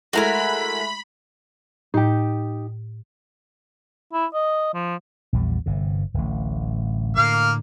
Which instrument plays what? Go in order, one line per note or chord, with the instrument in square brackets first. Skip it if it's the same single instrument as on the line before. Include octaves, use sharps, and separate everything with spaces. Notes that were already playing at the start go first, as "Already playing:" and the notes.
[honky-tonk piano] G#3 A3 E4 [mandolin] F#4 A#4 G#5 [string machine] B5
[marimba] A2 [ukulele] D#4 G4
[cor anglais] E4
D#5
F3
[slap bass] A#1 E2 G3
G1 C3
D1 A1
[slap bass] A2 D3 [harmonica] A#3 F5